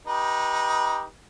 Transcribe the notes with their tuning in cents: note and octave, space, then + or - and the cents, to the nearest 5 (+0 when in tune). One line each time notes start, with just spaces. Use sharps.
D#4 +5 G4 +0 B4 -30